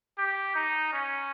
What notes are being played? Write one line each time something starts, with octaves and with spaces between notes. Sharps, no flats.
G4
D#4
C#4